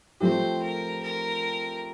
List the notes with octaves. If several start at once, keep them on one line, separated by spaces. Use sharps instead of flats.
F3 A3 C4 G4 C5
A#4
A#4